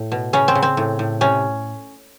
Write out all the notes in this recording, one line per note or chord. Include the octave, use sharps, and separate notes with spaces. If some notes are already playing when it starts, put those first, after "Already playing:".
Already playing: A2
B2
C#3 C#4
C4
C#3
C4
A2
A2
C3 C#4